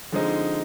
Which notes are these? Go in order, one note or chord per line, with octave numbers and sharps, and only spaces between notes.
D3 F3 G#3 C4 D#4